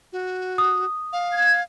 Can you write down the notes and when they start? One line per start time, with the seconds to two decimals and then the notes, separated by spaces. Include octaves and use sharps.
0.13 F#4
0.58 D#6
1.13 F5
1.32 G#6